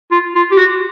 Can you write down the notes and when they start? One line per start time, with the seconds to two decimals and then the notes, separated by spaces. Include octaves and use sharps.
0.11 F4
0.35 F4
0.52 G4
0.58 F#4